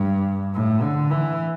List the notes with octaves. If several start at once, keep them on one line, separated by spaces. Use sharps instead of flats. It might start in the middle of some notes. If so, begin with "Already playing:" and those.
Already playing: G2
A2
D3
E3